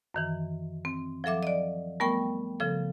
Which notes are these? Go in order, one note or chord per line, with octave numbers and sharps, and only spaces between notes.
F#2 D#3 E3
C4
F3 F#3 A4 E5 D6
D5 D#5
G3 A3 B3 A#4 G5 C#6
C#3 F3 A4